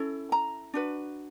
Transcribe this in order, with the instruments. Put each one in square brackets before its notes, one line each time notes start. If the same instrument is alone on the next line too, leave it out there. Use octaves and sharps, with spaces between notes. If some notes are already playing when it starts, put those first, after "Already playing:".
Already playing: [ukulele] C#4 E4 A4
A#5
D4 F#4 B4